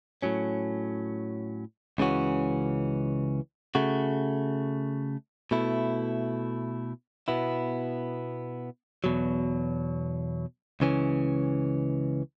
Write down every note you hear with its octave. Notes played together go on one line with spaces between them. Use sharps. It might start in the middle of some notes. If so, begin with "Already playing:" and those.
A2 F#3 C#4
C#2 C#3 E3 C#4 F#4
C#3 A3 F#4
B2 A3 E4
B2 B3 E4
E2 B2 F#3
C#2 C#3 E3 C#4